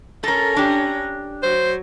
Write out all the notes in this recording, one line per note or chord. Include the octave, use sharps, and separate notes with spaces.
C#4 A4 A#4 A#5
D4 G4
F#3 C5